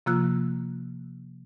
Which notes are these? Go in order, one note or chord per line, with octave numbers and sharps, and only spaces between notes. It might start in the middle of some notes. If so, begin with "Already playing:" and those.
C3 F3 A#3 F4 E6 F#6